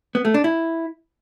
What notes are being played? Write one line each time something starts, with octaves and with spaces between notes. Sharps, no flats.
B3
A3
D4
E4